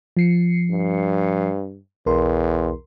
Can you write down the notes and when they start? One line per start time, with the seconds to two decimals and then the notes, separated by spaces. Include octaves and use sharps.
0.17 F3 C7 C#7
0.70 G2
2.06 B1 E2 A#4 C6